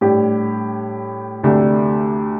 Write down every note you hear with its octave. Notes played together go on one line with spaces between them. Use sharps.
A2 G3 D4 G4
D2 C3 A3 D4 G4